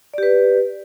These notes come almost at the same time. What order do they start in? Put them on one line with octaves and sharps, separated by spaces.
D5 G4 B4